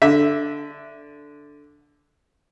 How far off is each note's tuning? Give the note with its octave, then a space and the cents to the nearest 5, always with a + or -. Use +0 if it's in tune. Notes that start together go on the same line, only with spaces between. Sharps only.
D3 +0 E5 +0